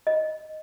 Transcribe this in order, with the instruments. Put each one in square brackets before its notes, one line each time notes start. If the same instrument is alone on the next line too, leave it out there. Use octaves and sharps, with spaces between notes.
[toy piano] D#5